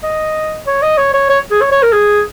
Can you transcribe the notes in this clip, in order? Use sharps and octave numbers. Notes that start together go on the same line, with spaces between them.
D#5
C#5
D#5
C#5
C#5
C#5
G#4
C#5
C#5
A#4
G#4